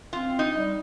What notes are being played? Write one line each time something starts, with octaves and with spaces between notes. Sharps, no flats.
C4 F4
D#4
G3